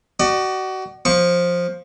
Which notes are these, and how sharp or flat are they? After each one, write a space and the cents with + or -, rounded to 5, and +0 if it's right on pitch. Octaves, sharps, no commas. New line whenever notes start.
F#4 +30 D5 +40
F3 +10 C#6 +0